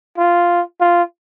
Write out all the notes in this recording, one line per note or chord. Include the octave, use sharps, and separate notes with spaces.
F4
F4